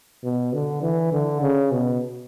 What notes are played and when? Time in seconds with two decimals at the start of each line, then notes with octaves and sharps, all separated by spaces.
0.24 B2
0.53 D3
0.82 E3
1.12 D3
1.42 C#3
1.72 B2